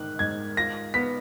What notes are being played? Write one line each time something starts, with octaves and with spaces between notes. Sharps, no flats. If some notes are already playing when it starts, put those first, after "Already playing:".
Already playing: G#2 D#3 F#6
G#2 G#6
F4 A#6
B3 B6